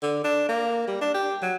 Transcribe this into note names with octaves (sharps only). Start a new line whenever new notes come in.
D3
D4
A#3
G3
D4
G4
F#3